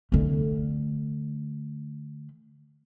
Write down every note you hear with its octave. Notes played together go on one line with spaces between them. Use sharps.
D3 A3